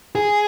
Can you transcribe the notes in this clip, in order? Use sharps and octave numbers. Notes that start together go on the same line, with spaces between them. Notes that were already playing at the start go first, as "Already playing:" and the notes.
G#4